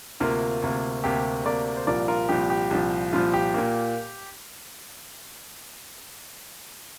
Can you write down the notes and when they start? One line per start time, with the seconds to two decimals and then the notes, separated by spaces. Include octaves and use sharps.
0.20 D2 C3 A#3 F4
0.62 D2 C3 A#3
1.04 D2 C3 A#3 G4
1.45 D2 C3 A#3 A#4 D5
1.77 C5
1.87 C2 A#2 F3 A#4 D5
2.08 F4 A#4
2.29 C2 A#2 F3 G4
2.50 G4
2.71 C2 A#2 F3
3.13 C2 A#2 F3 F4
3.34 G4
3.54 A#2 A#3